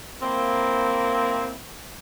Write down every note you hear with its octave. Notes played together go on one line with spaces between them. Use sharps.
A#3 C4 E4